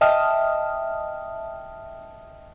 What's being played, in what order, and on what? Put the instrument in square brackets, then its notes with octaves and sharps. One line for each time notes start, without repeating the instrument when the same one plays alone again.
[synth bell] D#5 E5 G5 A5 D#6 F6